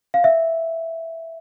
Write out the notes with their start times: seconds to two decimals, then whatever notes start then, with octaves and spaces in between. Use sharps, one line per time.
0.14 F5
0.24 E5